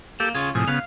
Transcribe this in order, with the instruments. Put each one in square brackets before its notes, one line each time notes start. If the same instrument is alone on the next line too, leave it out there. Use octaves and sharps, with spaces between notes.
[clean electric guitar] A#3 [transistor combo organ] G4 A4
[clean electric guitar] C#3 F4 C#5 [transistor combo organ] G#4
[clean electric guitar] C2 G#4 [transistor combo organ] A2 C3 F3
[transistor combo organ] C#3 B3 [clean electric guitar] F5